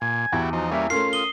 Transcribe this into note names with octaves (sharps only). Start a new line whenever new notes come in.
A#2 G#5
E2 E4 F#4 G4
F3 D#4 F#4
G3 A#3 C#4 E5
A3 C#4 F4 A#4 C6 C7
D#6 G7